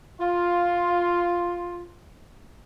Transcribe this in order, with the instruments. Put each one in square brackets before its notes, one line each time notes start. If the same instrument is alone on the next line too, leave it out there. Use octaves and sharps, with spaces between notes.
[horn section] F4 C6